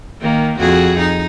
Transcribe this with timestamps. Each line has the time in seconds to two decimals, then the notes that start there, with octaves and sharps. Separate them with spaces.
0.21 D#3 A#3
0.59 F2 F#4 G#4
0.98 D#4